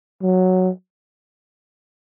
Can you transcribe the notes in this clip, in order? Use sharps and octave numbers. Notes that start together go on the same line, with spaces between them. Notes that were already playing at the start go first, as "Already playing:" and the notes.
F#3